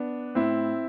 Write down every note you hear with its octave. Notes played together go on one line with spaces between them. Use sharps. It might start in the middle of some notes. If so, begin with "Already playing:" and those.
Already playing: B3 D4
A2 C4 E4